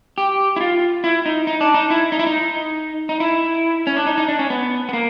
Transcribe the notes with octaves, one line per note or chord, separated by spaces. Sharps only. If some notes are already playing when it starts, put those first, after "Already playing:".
G4
E4
F4
E4
D#4
D#4
D4
D#4
E4
D#4
E4
D#4
D#4
E4
C#4
D4
D#4
D#4
D4
C#4
B3
B3
A#3